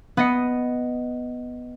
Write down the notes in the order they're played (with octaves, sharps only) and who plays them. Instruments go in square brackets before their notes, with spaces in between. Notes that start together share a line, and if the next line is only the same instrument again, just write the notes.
[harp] B3 D#5 C#7